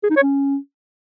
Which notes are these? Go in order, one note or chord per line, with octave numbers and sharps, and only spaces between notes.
G#4
D#4
C#5
C#4